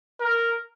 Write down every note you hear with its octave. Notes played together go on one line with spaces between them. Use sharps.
A#4